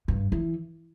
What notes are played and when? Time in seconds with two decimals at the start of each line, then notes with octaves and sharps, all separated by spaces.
0.08 G2
0.32 E3